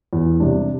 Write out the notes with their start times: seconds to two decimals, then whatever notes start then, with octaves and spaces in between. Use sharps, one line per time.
0.13 E2
0.40 C3 G3 D4